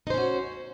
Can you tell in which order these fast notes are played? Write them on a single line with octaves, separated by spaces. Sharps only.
D#4 C5 C#4 F#4